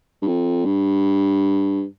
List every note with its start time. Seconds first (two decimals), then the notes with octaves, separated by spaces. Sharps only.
0.22 G2
0.28 F2
0.65 G2